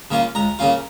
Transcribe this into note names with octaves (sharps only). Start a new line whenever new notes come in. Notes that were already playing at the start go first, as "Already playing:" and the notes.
C#3 A#3 C#4 F4
C#2 A#5
C#3 A#3 C#4 F4